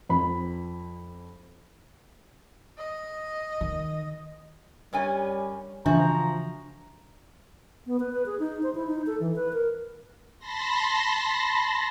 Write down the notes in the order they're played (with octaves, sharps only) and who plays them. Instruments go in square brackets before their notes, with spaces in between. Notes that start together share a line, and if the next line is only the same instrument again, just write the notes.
[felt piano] F2 B5
[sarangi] D#5
[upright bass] D#3
[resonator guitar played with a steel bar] F#2 C#4 G#5 [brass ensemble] G3
[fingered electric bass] C#3 E3 [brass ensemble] F3 A#5 [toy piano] D4 E5 [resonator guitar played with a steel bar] F#4
[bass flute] B3
B4
B4
G#4
D#4
C5
E4
D#4
A4
E3
B4
A#4
[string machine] A5 B5 C6 A#6